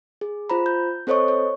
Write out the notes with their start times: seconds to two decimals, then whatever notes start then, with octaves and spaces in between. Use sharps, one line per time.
0.21 G#4
0.50 F4 C5 A#5 B5
0.66 G6
1.07 C4 A4 C5 C#5 D#5 C#6
1.28 C#5